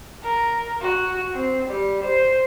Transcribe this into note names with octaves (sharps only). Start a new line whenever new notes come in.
A#4
F#4
C4
G3
C5